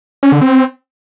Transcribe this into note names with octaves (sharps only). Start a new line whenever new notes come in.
C#4
D3
C4